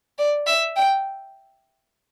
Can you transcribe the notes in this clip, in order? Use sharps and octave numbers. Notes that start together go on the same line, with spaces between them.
D5
E5
G5